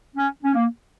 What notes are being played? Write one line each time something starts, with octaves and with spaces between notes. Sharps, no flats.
C#4
C#4
A#3